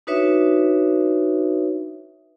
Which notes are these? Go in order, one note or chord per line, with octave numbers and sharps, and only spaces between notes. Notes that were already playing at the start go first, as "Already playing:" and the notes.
D4 D#4 F#4 B4 C#5 E5